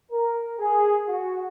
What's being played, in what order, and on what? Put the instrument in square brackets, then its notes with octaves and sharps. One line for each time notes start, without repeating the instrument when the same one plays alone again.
[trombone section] A#4
G#4
F#4